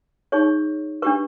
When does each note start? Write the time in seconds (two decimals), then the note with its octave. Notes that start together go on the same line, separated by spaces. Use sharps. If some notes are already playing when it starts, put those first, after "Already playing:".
0.32 D#4 G#4 C#5 C#6
1.02 D4 G4 B4 C#6